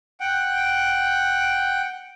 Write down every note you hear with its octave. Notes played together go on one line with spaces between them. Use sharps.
F#5 G5